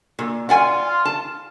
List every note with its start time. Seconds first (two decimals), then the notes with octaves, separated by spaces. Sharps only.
0.19 A#2
0.49 F4 D5 F#5 G#5
1.05 A5